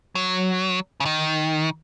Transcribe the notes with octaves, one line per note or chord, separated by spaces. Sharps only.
F#3
C#3
D#3